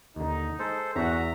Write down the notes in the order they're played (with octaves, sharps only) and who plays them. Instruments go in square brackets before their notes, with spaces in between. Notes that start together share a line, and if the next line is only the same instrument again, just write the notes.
[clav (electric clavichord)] D#2 D3 [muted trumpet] D#4
[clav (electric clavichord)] G#3 [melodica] A4 C5
[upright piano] E2 [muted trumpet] F#4 [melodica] E5 A#5